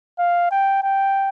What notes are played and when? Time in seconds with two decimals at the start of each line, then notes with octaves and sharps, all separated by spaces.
0.19 F5
0.51 G5
0.83 G5